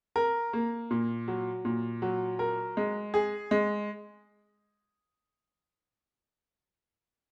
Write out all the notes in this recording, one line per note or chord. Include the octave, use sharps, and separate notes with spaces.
A#4
A#3
A#2
F#3
A#2
F#3
A#4
G#3
G#4
G#3